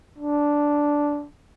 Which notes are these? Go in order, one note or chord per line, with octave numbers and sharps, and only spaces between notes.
D4